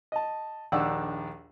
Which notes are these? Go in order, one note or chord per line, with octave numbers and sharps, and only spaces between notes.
D#5 A5
A#1 D#2 D4 D5 F#5 E6